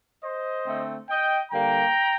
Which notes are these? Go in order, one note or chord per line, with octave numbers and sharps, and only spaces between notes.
C5 D#5
D3 A3 C4
D#5 G5
D3 G3 A#3 G5 A#5